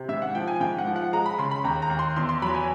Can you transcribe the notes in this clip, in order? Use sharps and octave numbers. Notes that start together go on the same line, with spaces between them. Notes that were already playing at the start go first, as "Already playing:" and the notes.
Already playing: C3
G#2 E5
F#5
F3 G5
G#5
G#2 G5
F#5
F3
F#5
G#3 A#5
B5
C#3 C6
B5
D#2 A#5
A#5
D#2
C6
E2 C6
C6
F#3 B5
G#5